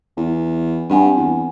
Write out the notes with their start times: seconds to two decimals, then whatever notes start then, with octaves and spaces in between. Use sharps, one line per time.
0.17 E2
0.90 G2 C4 F#5 G#5
1.17 E2